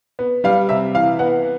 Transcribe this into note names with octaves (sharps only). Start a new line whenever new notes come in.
B3
G3 F5
C3 E5
E3 F5
B3 F#5